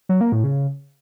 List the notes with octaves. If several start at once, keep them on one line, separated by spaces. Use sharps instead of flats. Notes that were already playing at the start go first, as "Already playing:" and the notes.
F#3
A#3
A2
C#3